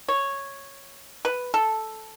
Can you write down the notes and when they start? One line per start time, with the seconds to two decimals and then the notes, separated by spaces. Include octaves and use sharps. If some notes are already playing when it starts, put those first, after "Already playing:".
0.08 C#5
1.25 B4
1.54 A4